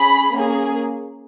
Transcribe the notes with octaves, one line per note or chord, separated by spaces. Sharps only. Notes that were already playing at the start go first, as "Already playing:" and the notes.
Already playing: C#4 G#4 B5
A#3 C#4 G#4